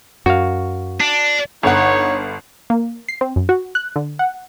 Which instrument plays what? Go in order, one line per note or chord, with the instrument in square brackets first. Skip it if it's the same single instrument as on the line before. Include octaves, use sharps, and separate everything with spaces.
[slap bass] F#2 [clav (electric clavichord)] F#4 F5
[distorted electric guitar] D4
[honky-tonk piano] G1 F#5 [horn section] D#4 C#5
[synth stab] A#3
C7
C4
F#2
F#4
F#6
D3
F#5